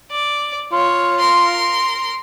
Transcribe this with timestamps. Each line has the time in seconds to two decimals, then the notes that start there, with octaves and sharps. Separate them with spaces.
0.11 D5
0.73 F4 C#5
1.19 A#4 C6